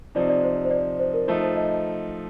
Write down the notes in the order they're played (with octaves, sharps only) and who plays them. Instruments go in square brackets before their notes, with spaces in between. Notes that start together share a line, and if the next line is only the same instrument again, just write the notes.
[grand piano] C3 F3 C4 D#4 [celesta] D5
[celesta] D5
C5
C5
D5
C5
A#4
[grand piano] F3 A3 D#4 [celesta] C5
[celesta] C5
D#5